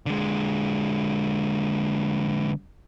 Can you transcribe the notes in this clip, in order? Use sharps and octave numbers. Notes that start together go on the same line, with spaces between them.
D3 G#3